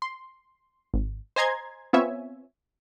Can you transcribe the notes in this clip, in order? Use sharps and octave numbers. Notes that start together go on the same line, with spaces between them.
C6
G#1
C5 D#5 G#5 A#5 C6 G#6
B3 C4 F4 C#5 E5 G#5